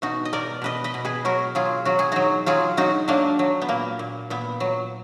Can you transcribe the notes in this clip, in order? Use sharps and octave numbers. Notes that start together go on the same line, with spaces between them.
B2 D#4 F#4
D#5
B2 A#4 D5
B2 B4 D#5
B4 D#5
B2
G#4 B4
F#3 F#4 A#4
F#3 F4 G#4
F#3 F#4
G#4
F#3 D#4 F#4
F#3 F4 G#4
F#3 D#4 F#4
F#3 A#3 D4
F#3
B3
A#2 A#3
A#2
A#2 B3
F#3